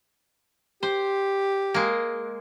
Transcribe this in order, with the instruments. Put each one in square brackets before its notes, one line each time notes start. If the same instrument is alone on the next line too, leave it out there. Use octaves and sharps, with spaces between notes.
[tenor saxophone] G4 [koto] C5
[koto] G#3 A#3